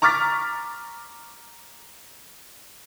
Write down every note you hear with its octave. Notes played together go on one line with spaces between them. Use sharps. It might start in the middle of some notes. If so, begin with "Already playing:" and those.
A#5 C#6 D6 F6 A6 B6